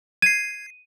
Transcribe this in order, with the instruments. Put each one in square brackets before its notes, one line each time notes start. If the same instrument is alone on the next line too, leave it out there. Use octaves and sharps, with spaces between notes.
[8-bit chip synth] G#6 C7 [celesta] D#7